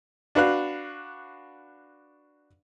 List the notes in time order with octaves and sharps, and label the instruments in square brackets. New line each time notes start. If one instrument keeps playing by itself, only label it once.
[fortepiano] D4 F#4 B4 F5 F#6